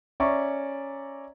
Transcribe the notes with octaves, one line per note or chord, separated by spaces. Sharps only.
C#4 D5 E5 A#5 C#6